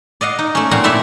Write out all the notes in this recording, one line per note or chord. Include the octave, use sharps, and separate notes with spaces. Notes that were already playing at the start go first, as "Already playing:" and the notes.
D5 D#5 F5 F#5
D#4
A3 C#4
F2 A#2 C4 F5 F#5 A#5
F2 A3 E4 D5 E5 A5